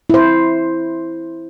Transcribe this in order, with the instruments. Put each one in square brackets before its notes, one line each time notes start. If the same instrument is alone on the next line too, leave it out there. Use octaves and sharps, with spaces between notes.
[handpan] E4 C5